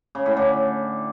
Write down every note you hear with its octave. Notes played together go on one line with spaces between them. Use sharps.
C#3
A2
D3